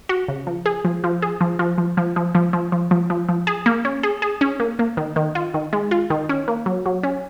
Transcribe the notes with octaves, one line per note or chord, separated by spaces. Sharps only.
F#4
C#3
F3
G#4
F3
F3
G#4
F3
F3
F3
F3
F3
F3
F3
F3
F3
F3
F3
G#4
A#3
C#4
G#4
G#4
C#4
A#3
A#3
D#3
D#3
F4
D#3
G#3
F4
D#3
C#4
A#3
F#3
F#3
C#4